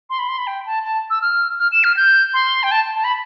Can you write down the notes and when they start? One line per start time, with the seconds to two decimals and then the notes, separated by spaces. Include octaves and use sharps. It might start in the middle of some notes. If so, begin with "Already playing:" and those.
0.10 C6
0.19 B5
0.29 C6
0.38 B5
0.47 G5
0.66 A5
0.84 A5
1.10 E6
1.22 F6
1.59 F6
1.72 E7
1.84 F6
1.97 G6
2.34 C6
2.63 G5
2.71 A5
2.96 A5
3.04 B5